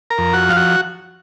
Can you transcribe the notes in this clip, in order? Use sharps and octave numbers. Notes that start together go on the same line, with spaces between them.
A#4 A#5
F2
F#4 F#5
F3 F5
F#4 F#5